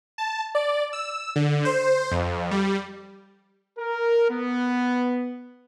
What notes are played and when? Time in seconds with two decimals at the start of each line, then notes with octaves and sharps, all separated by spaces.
0.18 A5
0.55 D5
0.93 E6
1.36 D3
1.65 C5
2.11 F2
2.51 G3
3.78 A#4
4.30 B3